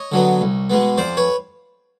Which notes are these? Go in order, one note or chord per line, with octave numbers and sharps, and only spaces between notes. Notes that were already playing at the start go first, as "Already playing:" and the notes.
Already playing: C#5 D#5
D3 F#3 B3
C2
B2 G#3 B3
F2 C5 D5
B4 C#5